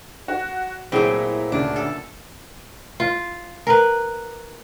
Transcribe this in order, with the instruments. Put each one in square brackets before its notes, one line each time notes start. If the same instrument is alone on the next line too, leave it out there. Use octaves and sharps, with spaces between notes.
[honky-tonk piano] F#4
[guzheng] A#2 A3 [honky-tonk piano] F#3 E4 [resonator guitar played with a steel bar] C4 G#4
[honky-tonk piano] D2 C#3 [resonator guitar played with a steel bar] D4
[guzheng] A4
[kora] F4
A#4 B4